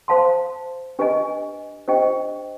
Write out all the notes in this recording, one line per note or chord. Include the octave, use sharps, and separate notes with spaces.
C5 F5 A5 C6
D4 G4 B4 D#5 G#5
D4 G4 C5 D#5 G5